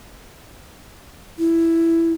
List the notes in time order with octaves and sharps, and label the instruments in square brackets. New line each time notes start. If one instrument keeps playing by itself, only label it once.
[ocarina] E4